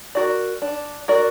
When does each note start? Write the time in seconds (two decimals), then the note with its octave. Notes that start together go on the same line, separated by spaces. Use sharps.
0.15 F#4 A#4 D5
0.62 D4
1.08 F#4 A#4 D5